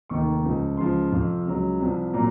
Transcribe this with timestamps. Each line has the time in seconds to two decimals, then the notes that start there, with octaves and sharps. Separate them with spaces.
0.09 F1 D#2 D#3 C#6
0.44 C#2 C#3 F3
0.77 C#2 C#3 F3 C6
1.12 F2 C3 F3
1.45 C#2 C#3 F#3
1.80 C2 C3 F3
2.14 A#2 F#3 A#5